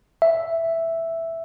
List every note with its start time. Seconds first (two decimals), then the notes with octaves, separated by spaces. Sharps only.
0.22 E5